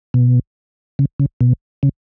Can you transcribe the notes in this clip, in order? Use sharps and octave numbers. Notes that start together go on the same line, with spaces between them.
B2
C#3
C#3
B2
C#3